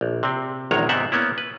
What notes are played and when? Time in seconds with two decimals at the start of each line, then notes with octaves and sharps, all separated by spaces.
0.01 A#1
0.23 C3 C4
0.71 A#1 E2 D#3 G#3 C#5 A#5
0.89 G#2 C3 B3 C4 E5 F#5
1.12 A#3 B3 C#4 E4
1.38 B4